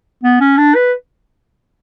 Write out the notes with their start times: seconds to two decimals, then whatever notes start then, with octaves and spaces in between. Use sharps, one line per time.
0.24 B3
0.40 C#4
0.58 D4
0.75 B4